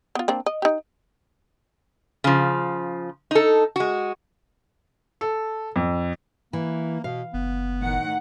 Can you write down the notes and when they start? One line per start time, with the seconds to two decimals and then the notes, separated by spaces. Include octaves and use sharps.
0.15 B3 F4
0.28 A#3 C4 D4
0.46 D#5
0.62 D#4 G4
2.24 C#3 F3
3.31 D#4 A4
3.76 G#3 F#4
5.21 A4
5.76 F2
6.53 E3 A#3
7.04 B2 F5
7.34 F#1 B3
7.80 A2 D#3 F#5